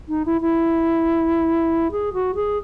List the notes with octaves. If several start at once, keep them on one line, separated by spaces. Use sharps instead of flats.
D#4
E4
E4
G#4
F#4
G#4